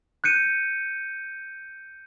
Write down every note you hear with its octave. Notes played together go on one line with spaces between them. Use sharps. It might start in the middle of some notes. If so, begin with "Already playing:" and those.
F#6 G6 C#7 D#7